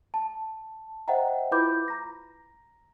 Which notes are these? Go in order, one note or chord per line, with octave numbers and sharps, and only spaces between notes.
A5
C5 D#5 E5 F#5 G5 A#5
E4 F4 B4 B5 D6 G6
A#5 A#6